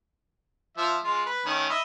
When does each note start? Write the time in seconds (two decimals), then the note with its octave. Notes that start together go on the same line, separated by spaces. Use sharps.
0.77 F3 E5
1.04 G#3 F4
1.26 B4
1.46 D#3 A3 C#4
1.70 D#5 E5 B5